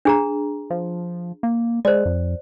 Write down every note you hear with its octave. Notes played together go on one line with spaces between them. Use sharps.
D4 G#4 A#5
F3
A#3
G#3 C5 D5
F2